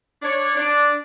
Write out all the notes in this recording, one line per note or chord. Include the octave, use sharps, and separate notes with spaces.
D4 C#5
D4